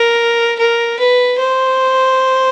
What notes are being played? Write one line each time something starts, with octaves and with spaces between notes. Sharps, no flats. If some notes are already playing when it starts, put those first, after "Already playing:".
Already playing: A#4
A#4
B4
C5